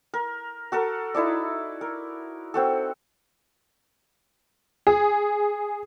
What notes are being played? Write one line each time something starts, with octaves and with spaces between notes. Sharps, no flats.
A#4
F#4 A4 A#4
D#4 E4 A4 D5
A#4
C4 F#4 A4
G#4